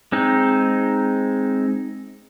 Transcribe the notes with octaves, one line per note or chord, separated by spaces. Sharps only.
G#3 C4 D#4